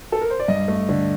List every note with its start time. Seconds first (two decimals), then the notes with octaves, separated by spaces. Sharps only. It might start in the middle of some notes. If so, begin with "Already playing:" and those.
0.12 A4
0.21 A#4
0.30 C5
0.40 D5
0.48 G2 D#5
0.68 A3
0.89 D3